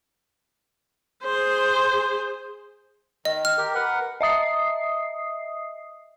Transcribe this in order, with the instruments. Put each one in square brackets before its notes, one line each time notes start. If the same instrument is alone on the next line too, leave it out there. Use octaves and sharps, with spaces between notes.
[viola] G#4 C5
[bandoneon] D#3 [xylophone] D#5
[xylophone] F6
[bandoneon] G4 A#4
A#4 B4 F#5
[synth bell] D#5 E5 D#6 C7